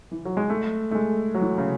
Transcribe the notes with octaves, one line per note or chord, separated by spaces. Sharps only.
E3
F#3
G#3
A3
A3
G#3
F#3
E3
C#3